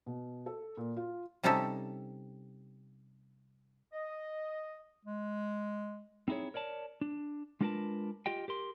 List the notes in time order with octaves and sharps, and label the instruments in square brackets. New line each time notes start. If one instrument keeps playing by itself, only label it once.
[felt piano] B2
A4
A#2
F4
[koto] C3 G3 C#4 D#4 G4 A4
[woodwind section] D#5
[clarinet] G#3
[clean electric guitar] C4 D#4 E4 G#4 C#5
A#4 C#5 D5 A5
D4
G#3 D4 F4 A#4 B4 A5
F4 G4 D#5 G5
G4 A#4 C6